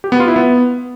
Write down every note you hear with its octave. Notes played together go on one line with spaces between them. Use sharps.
G4
B3
F4
E4
B3